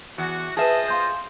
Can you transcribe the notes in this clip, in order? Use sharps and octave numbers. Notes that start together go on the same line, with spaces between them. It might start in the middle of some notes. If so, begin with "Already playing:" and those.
E2 F#4
F4 G#4 B4 C5 D#5 E5 A5
F5 C6 G6